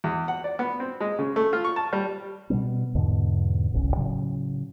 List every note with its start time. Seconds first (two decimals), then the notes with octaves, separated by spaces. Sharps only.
0.04 E2
0.28 F#5
0.44 D5
0.59 B3
0.80 C4
1.00 G#3
1.19 C#3
1.36 A3
1.53 F4
1.64 C#6
1.76 A5
1.93 G3
2.50 B2 D3 G3 B3
2.95 E2 G#2 B2 D3
3.72 D1 G1 C2 C#4
3.97 A2 C#3 F#3